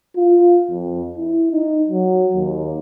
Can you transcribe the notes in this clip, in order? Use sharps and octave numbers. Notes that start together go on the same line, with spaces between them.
F4
F2
E4
D#4
F#3
D#2